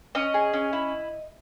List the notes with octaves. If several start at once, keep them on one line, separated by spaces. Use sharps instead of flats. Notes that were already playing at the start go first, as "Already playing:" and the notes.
C#4 D#5
G#4
C#4
E4